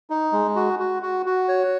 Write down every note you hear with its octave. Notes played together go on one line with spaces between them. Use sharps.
D#4
G#3
F#4
F#4
F#4
F#4
C#5